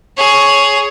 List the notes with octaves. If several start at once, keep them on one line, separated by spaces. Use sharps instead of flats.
G#4 C#5